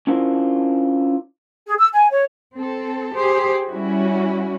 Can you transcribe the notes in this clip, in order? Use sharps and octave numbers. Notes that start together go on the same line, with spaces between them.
C#4 D4 E4 F4 A#4 C5
G#4
E6
G#5
C#5
C4 A4
G4 G#4 C5
G3 C#4 E4 F#4